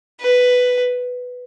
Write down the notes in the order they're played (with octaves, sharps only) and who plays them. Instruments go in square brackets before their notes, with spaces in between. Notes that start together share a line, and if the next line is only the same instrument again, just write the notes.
[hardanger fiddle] B4